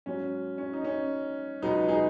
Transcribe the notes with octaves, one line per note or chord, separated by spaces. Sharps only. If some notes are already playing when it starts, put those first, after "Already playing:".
G#2 F#3 C#4
C#4
D#4
C#4
C#2 B2 F#3 B3 D#4
D#4 G#4